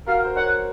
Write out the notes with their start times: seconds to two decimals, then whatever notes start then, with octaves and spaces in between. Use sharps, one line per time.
0.06 F#4 A#4 F5
0.24 C5
0.36 A#4 C#5 F#5